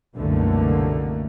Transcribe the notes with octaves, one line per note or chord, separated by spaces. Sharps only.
C2 F#2 B2 D3 A3 A#3